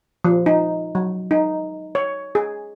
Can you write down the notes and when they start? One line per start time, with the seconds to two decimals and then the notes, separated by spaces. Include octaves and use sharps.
0.24 F3
0.46 D#4
0.95 F#3
1.31 D#4
1.95 C#5
2.35 G#4